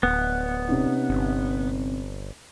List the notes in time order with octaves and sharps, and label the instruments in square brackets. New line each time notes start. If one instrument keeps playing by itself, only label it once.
[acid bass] D1 [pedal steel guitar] B3
[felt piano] C3 C#4 D#4
[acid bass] G1